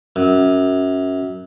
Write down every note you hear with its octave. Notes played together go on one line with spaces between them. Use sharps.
F#2